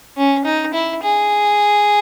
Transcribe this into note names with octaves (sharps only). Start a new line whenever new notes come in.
C#4
D#4
E4
G#4